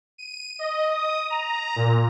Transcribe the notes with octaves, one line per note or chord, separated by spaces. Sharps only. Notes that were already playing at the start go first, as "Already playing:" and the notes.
D#7
D#5
D#6
A#5
A#2